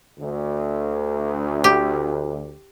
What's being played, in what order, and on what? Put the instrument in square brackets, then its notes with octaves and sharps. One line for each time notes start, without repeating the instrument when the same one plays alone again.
[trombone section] D2
[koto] G4